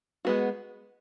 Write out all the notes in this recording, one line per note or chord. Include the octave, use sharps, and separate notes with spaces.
G#3 B3 F#4